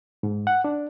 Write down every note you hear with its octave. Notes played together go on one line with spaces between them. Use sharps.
G#2
F#5
D4